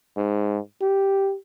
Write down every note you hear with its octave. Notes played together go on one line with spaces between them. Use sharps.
G#2
G4